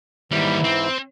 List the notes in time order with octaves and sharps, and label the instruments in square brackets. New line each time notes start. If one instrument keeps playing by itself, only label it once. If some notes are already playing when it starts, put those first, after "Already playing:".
[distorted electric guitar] D#2 G3 [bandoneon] G#2 E3 E4
[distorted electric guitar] C4